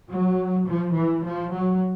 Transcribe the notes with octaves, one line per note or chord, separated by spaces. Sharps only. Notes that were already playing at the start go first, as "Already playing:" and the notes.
F#3
F3
E3
F3
F#3